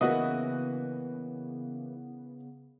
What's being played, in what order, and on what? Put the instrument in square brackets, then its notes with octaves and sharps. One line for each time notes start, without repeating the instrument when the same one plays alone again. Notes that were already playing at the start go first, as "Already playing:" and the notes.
[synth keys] C#3 B3 [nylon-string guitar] E3 A#3 E5 [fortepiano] F#4 D#5